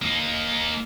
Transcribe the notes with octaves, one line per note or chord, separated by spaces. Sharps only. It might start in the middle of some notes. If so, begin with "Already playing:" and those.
A#3 D#4